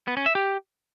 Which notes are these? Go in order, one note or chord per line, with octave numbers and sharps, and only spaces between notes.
B3
C#4
E5
G4